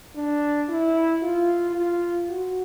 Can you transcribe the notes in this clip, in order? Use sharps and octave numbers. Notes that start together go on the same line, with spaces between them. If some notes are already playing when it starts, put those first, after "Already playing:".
D4
E4
F4
F4
F#4